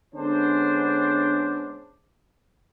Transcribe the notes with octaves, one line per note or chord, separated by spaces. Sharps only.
D3 G#3 B3 C#4 D4 C5